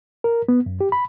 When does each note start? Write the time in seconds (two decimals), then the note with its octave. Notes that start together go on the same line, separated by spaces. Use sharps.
0.24 A#4
0.48 B3
0.66 F#2
0.81 G4
0.92 B5